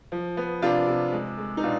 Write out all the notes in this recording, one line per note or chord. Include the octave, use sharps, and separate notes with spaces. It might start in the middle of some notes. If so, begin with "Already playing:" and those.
F3
B3
C3 D4 F4
C3
G#3
G#3
D#4
B2 D4 F4